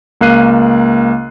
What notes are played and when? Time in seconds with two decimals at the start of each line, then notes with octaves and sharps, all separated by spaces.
0.21 C#2 A#3 F5 F#6 C7 D#7